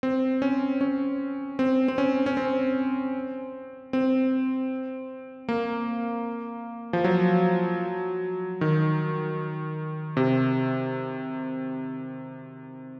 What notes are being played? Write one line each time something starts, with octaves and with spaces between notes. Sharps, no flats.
C4
C#4
C#4
C4
C4
C#4
C#4
C4
C4
A#3
F3
F#3
D#3
C3